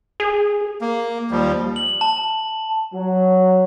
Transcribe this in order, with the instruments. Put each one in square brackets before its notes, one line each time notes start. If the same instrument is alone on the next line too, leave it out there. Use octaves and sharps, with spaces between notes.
[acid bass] G#4
[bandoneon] A#3
D#2 F3 G3
[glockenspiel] F#7
A5
[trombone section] F#3